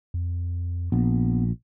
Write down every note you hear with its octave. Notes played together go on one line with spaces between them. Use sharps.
F2
A#1 B3